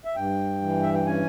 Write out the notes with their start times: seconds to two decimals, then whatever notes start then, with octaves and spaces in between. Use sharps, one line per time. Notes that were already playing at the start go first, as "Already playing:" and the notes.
0.05 E5
0.16 G2 G5
0.62 E3
0.82 E5
0.94 G5
1.06 C#4 G#5